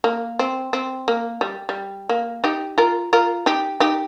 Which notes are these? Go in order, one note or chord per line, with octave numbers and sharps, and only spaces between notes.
A#3
C4
C4
A#3
G3
G3
A#3
D#4 G4
F4 A#4
F4 A#4
D#4 G4
D#4 G4